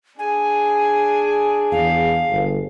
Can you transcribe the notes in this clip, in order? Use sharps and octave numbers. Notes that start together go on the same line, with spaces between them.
D4 G#4 G#5
E2 F5
G1